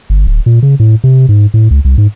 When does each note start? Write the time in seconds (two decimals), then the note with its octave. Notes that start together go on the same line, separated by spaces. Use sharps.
0.10 G1
0.27 D1
0.46 A#2
0.63 C#3
0.80 A2
1.04 C3
1.29 G#2
1.54 A2
1.71 C#2
1.85 C2
1.98 G#2